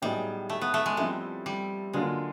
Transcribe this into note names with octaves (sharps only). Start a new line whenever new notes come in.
A2 F#3 G3 B3 D#4 G#4
A3
B3
A3
G#3
F3 G3 A3 C4 E4 A4
G3
D3 F#3 G#3 A#3 D4 F4